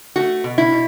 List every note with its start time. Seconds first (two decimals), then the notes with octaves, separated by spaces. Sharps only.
0.16 A3 F#4
0.44 B2
0.58 E4
0.72 B2